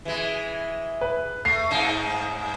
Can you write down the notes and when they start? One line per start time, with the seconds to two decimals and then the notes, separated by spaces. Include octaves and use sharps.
0.05 E3 G#3
1.01 B4
1.45 A3 C7
1.71 G2 D#4